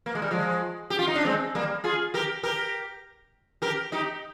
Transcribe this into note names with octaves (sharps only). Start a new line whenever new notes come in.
A#3
G#3
G3
F3 G#3
G4
F4
D#4
D4
G#3 C4
G3 A#3
F4 G#4
G4 A#4
G4 A#4
G4 A#4
D#4 G4